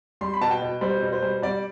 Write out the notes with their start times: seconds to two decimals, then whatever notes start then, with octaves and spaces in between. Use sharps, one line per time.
0.21 G3 C6
0.34 B5
0.41 B2 A5
0.51 G5
0.62 B2
0.81 G3 C5
1.02 B2
1.12 C5
1.23 G3
1.42 G3 D5